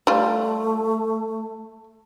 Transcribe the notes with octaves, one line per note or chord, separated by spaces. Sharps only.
G3 A3 F4